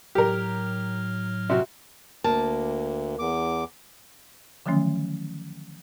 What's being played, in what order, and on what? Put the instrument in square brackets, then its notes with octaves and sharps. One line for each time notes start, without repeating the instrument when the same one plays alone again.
[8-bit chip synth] A2 F#3 F6 [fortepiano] G4 A#4
[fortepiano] C3 F#4
[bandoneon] D2 [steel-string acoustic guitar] A#3 [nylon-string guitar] A5
[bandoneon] E2 D6
[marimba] D3 D#3 F3 F#3 A3 C#4